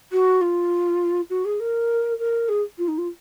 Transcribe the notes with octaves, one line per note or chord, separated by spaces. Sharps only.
F#4
F4
F#4
G#4
A#4
A#4
G#4
F4
D#4
F4